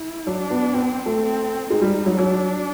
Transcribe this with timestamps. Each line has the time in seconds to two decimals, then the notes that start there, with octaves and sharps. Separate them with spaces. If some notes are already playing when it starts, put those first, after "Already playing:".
Already playing: E4
0.27 F#3 D4
0.51 B3
0.74 B3 C4
1.06 A3
1.22 C4
1.70 G#3 D#4
1.81 G3
2.06 F#3
2.18 F#3 D4